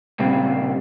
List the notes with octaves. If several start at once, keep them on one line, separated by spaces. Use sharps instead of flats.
A#2 C#3 G3 C4